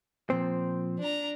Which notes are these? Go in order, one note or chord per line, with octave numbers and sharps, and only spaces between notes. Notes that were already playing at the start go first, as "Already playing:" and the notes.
A#2 F3 C4 C5
D4 A#5